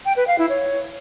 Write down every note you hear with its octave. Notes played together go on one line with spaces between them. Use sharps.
G5
B4
F5
E4
C#5